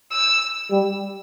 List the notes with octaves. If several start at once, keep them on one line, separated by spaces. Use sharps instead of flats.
E6
G3